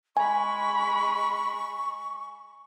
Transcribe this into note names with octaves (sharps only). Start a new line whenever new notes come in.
G#3 G#5 B5 C#6